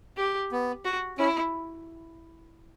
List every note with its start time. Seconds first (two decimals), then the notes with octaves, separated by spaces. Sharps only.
0.17 G4
0.52 B3
0.85 F#4
1.18 C#4 E4